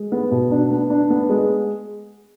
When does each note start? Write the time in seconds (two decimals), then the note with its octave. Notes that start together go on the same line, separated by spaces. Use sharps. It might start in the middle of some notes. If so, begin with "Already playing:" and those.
Already playing: G#3
0.12 B3
0.31 B2
0.51 D4
0.70 B3
0.90 D4
1.10 B3
1.30 G#3